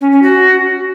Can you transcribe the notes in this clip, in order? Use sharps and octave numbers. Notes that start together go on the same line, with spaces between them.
C#4
C#4
F#4